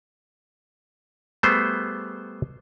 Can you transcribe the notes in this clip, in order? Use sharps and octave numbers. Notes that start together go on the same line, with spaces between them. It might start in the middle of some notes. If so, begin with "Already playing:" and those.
G3 A3 B3 G#4 C5